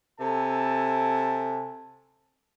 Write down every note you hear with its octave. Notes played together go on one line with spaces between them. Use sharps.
C3 A4 G#5 A5